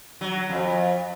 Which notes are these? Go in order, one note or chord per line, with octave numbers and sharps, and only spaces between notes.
F#3
F2